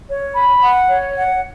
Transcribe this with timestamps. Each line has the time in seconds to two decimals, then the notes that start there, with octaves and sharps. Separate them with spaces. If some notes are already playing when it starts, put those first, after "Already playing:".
0.09 C#5
0.35 B5
0.62 F#5
0.89 C#5
1.16 F#5